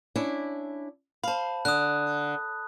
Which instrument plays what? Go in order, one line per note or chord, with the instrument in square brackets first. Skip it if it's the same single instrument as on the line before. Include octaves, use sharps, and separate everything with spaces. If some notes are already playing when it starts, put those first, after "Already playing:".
[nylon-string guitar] C#4 D4 E4
[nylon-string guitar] C5 F5 [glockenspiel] A5 B5
[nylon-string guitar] D3 [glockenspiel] D#6 F#6